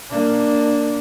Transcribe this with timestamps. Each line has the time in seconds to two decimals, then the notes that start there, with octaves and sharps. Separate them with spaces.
0.11 A#3 D4